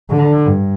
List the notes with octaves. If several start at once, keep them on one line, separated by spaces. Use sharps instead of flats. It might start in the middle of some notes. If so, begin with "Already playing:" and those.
D3
G2